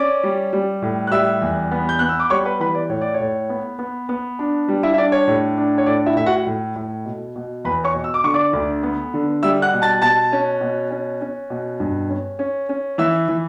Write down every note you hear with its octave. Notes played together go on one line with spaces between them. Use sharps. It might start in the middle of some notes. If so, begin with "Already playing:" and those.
Already playing: C#4 D5 D6
G3
G3
A2
F#6
G3 E5 E6
E2
B3
G6
B3 F#6
E6
D6
G3 C#5 C#6
B4 B5
E3 B4 B5
D5
A2 C#5
D5
C#5
A2
B3
B3
B3
D4
G3
E4 E5
E5
D4 D5
C#5
A2
D4
C#5
A2 D5
E4 E5
A2 E5
F#4 F#5
A2
A2
B2
B2
E2 B4 B5
C#5 C#6
B2
E6
D6
D3 C#6
D5 D6
D2
B3
D3
G3 E5 E6
F#5 F#6
B2
A5 A6
B2 A5 A6
C#4
B2
C#4
C#4
B2
G2
C#4
C#4
C#4
E3 E5 E6
E3